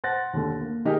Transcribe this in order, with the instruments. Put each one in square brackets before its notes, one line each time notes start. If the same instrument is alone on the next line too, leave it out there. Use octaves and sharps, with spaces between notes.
[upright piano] C5 F#5 F#6 A6 A#6
D#2 D3
A#3
D#3 D#4 G4 G#4 A#4